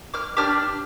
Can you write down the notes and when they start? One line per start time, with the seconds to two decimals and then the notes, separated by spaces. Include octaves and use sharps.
0.14 D6 F6
0.37 D4 G4 D6 F6